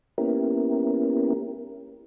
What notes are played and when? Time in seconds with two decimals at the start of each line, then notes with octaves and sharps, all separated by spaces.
0.18 A#3 B3 C#4 E4 G4 A#4